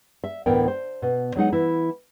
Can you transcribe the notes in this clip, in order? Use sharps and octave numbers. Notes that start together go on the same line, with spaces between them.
E5
D2 A2 E3 B3 A#4 G5
C5
B2
F#3 G#3 D#4 F#5
E3 E4